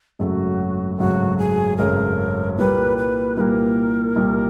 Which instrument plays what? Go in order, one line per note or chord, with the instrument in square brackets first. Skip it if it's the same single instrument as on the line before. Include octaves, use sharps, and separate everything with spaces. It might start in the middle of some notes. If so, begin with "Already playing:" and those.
[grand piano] G#1 F#2 C#3 F#3 A3 [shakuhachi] F#4 G#4
[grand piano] G#1 F#2 C#3 F#3 A3 [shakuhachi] F#4
[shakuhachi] G#4
[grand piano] G#1 F#2 C#3 F#3 A3 [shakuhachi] A#4
[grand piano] C2 A#2 G3 A#3 [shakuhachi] B4
[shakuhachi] B4
[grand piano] C2 A#2 G3 A#3 [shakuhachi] A#4 B4
[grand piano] C2 A#2 G3 A#3